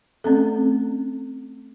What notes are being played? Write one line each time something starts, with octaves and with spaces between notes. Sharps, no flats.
A3 C4 C#4 A4